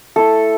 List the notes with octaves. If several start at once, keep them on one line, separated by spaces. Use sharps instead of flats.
A3 E4 A4